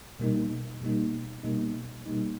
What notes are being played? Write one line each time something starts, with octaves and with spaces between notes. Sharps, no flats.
B2 G3 A#3 D#4
B2 G3 A#3 D#4
B2 G3 A#3 D#4
B2 G3 A#3 D#4